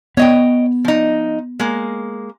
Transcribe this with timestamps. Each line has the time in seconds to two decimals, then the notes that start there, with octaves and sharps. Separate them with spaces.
0.17 B3 C#5 D#5 G5
0.85 F3 D#4
1.59 G#3 A#3